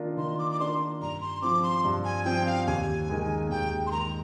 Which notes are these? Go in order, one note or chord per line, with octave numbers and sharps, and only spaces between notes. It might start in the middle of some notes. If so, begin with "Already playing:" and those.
Already playing: D#3 A#3 D4 F4 A#4
D#3 C6
D6
D6
A#3 D4 F4 A#4 C6
G2 A#5
C6
F3 C4 D6
C6
G2
G#5
F3 C4 G5
F5
D#2 G#5
D#3 G#3
D#2 G5
C6
D#3 G#3 A#5